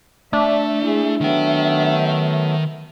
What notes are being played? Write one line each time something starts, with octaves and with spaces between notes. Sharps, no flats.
A3 D4 E5
E4 G#4
D#3 F#3 A3 B3 E5 G5